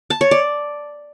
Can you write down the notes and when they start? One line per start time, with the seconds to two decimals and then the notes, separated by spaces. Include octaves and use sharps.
0.10 A5
0.21 C#5
0.31 D5